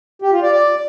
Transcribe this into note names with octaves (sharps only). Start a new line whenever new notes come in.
G4
F4
D5
D5